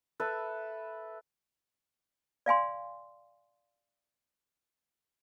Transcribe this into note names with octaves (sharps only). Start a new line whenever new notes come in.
A4 B4 E5
D5 F5 G#5 C6